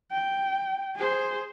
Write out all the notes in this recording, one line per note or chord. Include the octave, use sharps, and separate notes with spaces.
G5
G#4 C5